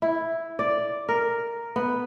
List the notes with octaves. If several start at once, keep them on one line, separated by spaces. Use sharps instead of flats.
E4
D5
A#4
B3